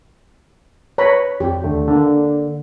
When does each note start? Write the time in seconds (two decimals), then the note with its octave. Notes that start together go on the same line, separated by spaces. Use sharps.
0.98 B4 C#5 A#5 B5
1.40 F2 G4 G5
1.64 D#2 D3 A3
1.88 D3 A#3